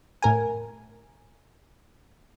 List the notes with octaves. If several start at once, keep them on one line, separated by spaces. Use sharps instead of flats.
A2 A#4 G#5